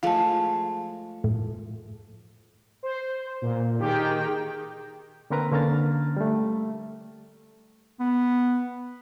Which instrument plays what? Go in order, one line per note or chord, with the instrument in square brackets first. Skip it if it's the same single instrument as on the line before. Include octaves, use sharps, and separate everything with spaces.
[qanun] F3 G#3 A3 [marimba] F5 A5
[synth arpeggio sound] A2
[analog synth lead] C5
A#2
[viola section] D#3 G#4 G5 [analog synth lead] G4
[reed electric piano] D3 A#3 C4 A#4 B4 A#5
D3 A#3 C#4 A#5 F6 A6
G3 A3
[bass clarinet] B3